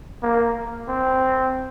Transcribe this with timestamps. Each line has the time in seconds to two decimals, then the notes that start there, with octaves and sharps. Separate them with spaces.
0.22 A#3
0.88 C4